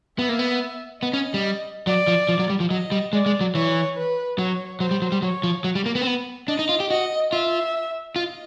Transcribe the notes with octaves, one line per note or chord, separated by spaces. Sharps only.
B3 E5
A#3
B3
B3 D#5
C#4
G3
F#3 D5
F3
F3
F#3
G3
F3
F#3 D#5
G3
G#3 D5
G#3
F#3
E3 C#5
B4
F#3 C#5
F#3 C5
G3
F#3
G3
F#3 C#5
F3
F#3
G3
A#3
B3
C4
B3
D4 D#5
D#4
F4
G4
F#4 D#5
F4 E5
F4 D#5